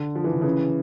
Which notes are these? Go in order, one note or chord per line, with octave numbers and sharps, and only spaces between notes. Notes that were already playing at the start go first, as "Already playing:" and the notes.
Already playing: D3
F3
E3
D3
C#3 E3